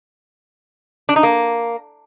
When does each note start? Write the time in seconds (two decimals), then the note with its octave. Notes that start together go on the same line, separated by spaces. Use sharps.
1.09 D4
1.16 D#4
1.23 A#3